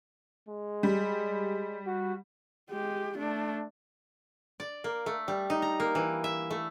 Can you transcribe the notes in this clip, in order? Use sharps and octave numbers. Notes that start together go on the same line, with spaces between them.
G#3
G3
F#4
G#3 G4
A3 D4
D5
A#3
A3
G3
D#4
A#5
A#3
E3
E5
A3